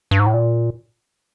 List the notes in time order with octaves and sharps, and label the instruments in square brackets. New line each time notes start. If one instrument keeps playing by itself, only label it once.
[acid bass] G2
G#2
A2
A#2